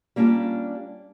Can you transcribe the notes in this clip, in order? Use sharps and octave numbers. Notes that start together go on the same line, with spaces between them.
G3 A#3 C#4 D4 F4 G4